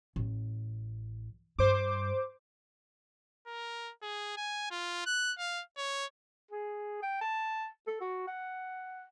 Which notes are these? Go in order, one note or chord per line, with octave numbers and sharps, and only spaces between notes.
A1
G2 C5 D6
A#4
G#4
G#5
F4
F#6
F5
C#5
G#4
G5
A5
A4
F#4
F#5